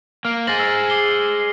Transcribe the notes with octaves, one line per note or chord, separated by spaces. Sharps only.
A#3 F6 D7
G#4 C5 A6 A#6 F#7
E6 A6 A#6
D6 C7 G7